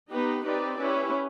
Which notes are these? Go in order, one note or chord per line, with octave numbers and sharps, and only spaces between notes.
B3 D#4 G4 B4
C4 D#4 G4 B4 D5
C#4 E4 G4 B4